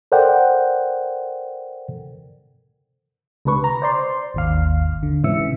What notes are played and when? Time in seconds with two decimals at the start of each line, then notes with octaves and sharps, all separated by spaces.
0.12 A4 A#4 C5 D5 F#5 G5
3.45 C#2 C3 D4 B4 C#6
3.64 A#5
3.82 C5 D5 C6
4.34 G#1 D#2 F5
5.03 D3
5.24 G#2 C3 E3 C#4 E5 C#7